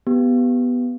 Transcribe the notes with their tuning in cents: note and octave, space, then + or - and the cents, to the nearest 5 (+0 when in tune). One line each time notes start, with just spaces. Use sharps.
B3 +0 G4 -10